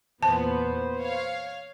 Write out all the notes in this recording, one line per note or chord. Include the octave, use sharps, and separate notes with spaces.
E2 A#2 B3 B4 C5 A5
C#5 F5